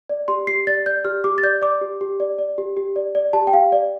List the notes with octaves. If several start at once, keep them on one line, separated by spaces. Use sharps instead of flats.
D5
G4 C6
G4 C7
D5 A6
D5 G6
G4 F6
G4 D6
A6
D5 G6
D5 D6
G4
G4
D5
D5
G4
G4
D5
D5
G4 A5
G5
G4 F5
D5